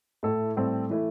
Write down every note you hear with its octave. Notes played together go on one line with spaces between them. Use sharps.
A2 A3 E4 A4
A2 G3 C4 A4
E3 A3 E4